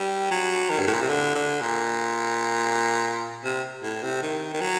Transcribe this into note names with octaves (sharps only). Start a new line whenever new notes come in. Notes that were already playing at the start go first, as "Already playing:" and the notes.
Already playing: G3
F#3
D#3
G2
A2
A#2
C3
D3
D3
A#2
C3
A2
C3
D#3
D#3
F#3